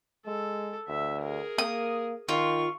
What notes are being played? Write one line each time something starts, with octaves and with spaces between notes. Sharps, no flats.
G#3 A4
D2 E5
G#4 A#4
A#3 D#6
D#3 F4 C#6